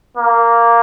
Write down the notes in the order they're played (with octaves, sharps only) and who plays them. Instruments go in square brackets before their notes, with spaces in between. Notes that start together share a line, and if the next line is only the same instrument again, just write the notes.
[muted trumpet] A#3